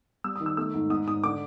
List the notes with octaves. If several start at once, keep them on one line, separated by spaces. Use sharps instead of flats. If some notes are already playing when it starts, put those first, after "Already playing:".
G3 E6
D#6
D#3
E6
A3 E6
G#2
G#2 D#6
G#2 D#6
D3 D6